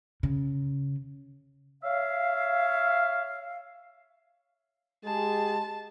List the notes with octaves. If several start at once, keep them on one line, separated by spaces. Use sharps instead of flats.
C#3
C#5 E5 F5
G#3 G4 G#4 A5